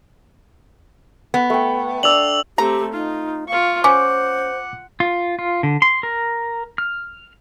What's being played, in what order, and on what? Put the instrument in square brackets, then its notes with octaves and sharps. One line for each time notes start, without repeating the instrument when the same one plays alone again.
[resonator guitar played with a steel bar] B3
[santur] A3 G5
[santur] D4 D5 [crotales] E6 F7 F#7
[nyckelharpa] A3 C4 [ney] G4 [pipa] A#5
[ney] D#4 [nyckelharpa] F4
[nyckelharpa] F4 C#6 [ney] F5
[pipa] C#4 [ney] C5 [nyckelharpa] F#5 [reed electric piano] D6
[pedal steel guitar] F4
F4
D3
C6
A#4
F6